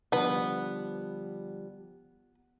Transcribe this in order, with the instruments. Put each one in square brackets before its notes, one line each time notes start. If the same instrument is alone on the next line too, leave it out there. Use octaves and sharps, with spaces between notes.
[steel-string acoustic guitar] D3 F3 G3 [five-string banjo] B3 B4